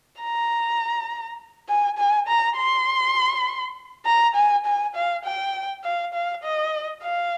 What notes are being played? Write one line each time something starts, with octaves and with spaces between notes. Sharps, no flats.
A#5
G#5
G#5
A#5
C6
A#5
G#5
G#5
F5
G5
F5
F5
D#5
F5